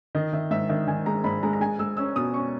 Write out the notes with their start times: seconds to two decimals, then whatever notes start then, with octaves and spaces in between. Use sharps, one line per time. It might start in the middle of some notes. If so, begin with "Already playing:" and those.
0.15 D#3 D#5
0.33 D#3 E5
0.51 G#2 E5
0.69 D#3 E5
0.87 D#3 G#5
1.06 G#3 A#5
1.24 G#2 B5
1.43 G#3 A#5
1.53 A#5
1.61 G#3 G#5
1.79 G#3 E6
1.97 C#4 E6
2.16 B2 D#6
2.34 C#4 C#6